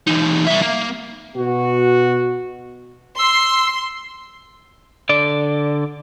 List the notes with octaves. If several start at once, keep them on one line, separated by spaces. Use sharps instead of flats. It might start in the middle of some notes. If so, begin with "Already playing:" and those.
E2 D#4
G3 E5
A#3
B2 F#4
C6 E6
D3 D5